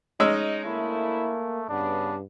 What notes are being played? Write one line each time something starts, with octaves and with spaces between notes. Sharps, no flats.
G#3 C#4 D#4 E6
D2 A3 A#3 E4
G2 C#3 B3 D4